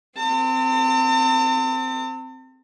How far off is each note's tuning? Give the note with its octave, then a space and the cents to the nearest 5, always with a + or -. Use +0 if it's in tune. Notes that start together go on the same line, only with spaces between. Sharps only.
C4 -10 A5 +45